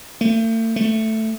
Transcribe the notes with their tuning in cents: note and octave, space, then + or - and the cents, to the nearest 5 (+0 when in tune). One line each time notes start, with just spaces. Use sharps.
A3 +40
A3 +5